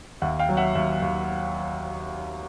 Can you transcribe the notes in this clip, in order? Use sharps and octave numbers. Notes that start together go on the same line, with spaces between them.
D#2 E5 F#5
F5 G5
F#3
E5 F#5
D#2 E5
D#2